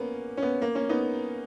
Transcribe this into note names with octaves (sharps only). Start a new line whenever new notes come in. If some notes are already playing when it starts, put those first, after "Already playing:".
Already playing: A#3 B3 C#4
C#4
B3
A#3
A#3 C#4
B3 D#4